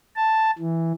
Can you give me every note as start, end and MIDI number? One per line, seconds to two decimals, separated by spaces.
0.16 0.51 81
0.59 0.92 52